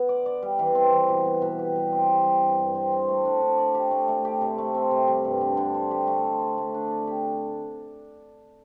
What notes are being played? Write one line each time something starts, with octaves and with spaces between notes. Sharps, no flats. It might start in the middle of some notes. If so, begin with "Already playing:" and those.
Already playing: B3
D5
D5
G3
E3
C4
E3
B2
B2
B2
G4
G3
C4
G3
G3
G2
G2
C4
C4
A3
D4
D4
D5
G4
A3
A3
G4
C3
A3
C4
C3
G3
G2
D3
D3
C5
G4
A3
C5
A4
A3
D4
D5
G4